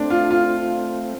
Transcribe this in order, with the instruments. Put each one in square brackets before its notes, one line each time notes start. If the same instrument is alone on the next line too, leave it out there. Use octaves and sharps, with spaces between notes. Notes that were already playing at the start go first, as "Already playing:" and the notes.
Already playing: [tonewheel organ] A3 C4 [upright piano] D4
[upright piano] F4
F4